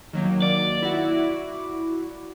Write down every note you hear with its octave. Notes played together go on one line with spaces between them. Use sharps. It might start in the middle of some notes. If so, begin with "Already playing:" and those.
D#3 F#3 A#3
D5
E4 F#4